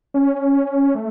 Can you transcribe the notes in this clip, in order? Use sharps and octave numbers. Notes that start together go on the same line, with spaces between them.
C#4
A3